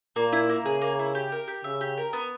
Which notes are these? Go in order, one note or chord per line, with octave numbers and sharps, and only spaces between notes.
A#2 A#3
E4
A#3
C#3 G#4
A#3
E4
G4
A#4
G4
C#3 E5
G4
A#4
B3